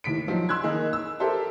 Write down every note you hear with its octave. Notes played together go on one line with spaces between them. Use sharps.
D#2 A2 B6 D7
F3 F#3 D#4
C6 E6 F#6 G#6
D#3 A#3 D#4 G#4
E6
G4 A4 A#4 C5 E5 A5